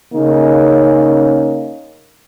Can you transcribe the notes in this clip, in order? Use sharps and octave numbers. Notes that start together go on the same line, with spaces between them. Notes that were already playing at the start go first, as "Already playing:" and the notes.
C#3 A#3 C#4 D#4